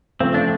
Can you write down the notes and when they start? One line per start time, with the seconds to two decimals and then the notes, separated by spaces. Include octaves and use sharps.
0.20 C#3 F3 A3 C4
0.34 D4